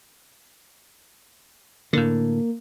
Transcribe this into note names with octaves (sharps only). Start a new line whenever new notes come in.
A2 D3 A#3